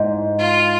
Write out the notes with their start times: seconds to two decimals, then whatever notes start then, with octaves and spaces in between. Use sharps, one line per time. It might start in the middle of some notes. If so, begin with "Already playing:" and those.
Already playing: G#2
0.39 F4